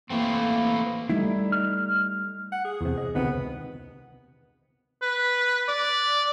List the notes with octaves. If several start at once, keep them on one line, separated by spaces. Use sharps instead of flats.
E3 A3 A#3 C4
G3 A3 D#4 E4
F6
F#5
G#4
E2 C3
D#5
C#2 C3 D#3 B3
B4
D5